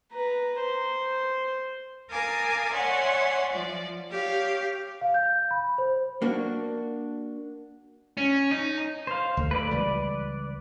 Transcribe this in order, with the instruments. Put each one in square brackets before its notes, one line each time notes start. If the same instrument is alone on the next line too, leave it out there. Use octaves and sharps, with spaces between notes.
[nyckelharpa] B4 A#5
C5
[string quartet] A#4 F5 G#5 A5 D6 D#6
C#5 D5 E5 F#5 G#5 C6
F3 D5
G4 C#5 F5
[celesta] F5
G6
B5
C5
[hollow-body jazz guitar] A#3 D4 F#4
[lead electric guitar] C#4
D#4
[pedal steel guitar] C5 F5
[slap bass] D2
[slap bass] A3 [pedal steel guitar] B4 D5
[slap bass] C#2 E3 G3